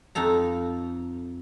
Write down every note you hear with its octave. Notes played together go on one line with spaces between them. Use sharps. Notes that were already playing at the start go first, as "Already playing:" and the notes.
F2 D#4 A4 A#5